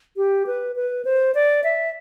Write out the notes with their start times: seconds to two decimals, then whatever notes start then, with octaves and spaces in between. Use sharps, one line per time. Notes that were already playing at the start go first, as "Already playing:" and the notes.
0.17 G4
0.47 B4
0.76 B4
1.05 C5
1.35 D5
1.64 E5